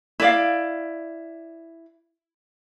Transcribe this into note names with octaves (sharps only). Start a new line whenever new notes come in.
E4 D5 F5